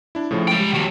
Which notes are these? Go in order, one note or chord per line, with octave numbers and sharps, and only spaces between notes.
D4 E4
A2 C#3 F3
G#3 G5
G3
D#2 F#4